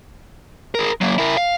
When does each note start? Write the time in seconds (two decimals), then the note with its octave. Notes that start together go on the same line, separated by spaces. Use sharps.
0.75 G#4 A#4
1.01 F#3 A#3
1.18 E4 A#4
1.38 F5